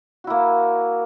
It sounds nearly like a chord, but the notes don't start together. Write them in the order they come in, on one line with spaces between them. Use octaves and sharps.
F#4 E4 A#3